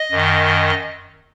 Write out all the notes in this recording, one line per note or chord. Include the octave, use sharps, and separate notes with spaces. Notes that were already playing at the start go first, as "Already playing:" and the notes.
Already playing: D#5
F#2 D#3